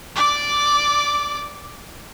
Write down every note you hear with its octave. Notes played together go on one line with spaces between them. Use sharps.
D5 D6